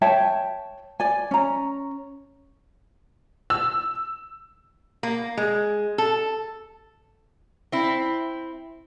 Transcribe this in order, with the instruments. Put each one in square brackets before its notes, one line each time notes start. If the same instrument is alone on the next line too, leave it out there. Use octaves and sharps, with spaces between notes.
[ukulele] C#5 E5 G5 A5
D5 G#5
C#4 A#5
[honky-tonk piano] E6
[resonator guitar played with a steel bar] A#3
G#3
A4
C4 E4